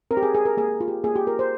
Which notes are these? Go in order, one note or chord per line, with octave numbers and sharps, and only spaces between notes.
C4 A#4
G4
G#4
G4 G#4
A#4
A#3 G#4
F4
G4
A#3 G#4
G4
F4 A#4
C5